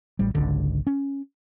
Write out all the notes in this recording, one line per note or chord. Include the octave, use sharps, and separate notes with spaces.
A1 G3
G#1 C#2 D3
C#4